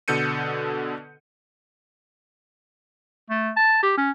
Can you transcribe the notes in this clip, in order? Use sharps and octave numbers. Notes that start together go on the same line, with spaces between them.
B2 D3 A4 G6 C#7 D#7
A3
A5
G4
C#4